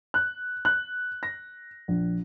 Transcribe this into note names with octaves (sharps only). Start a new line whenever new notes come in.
F#6
F#6
A#6
A#1